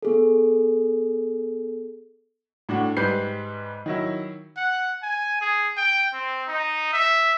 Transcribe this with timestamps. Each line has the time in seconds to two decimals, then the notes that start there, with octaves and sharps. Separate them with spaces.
0.03 B3 G#4 A4
2.69 A2 D4 F#4
2.97 G#2 G3 B4 G6 C7
3.86 D#3 F#3 E4
4.57 F#5
5.03 G#5
5.41 G#4
5.77 G5
6.13 C4
6.48 D#4
6.93 E5